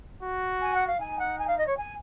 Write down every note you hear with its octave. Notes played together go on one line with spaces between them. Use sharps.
F#4
G#5
F#5
F5
D#4 G#5
F#5
G#5
F5
D#5
C#5
G#5